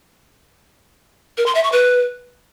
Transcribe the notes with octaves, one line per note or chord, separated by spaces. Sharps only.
A#4
C6
E5
C#6
B4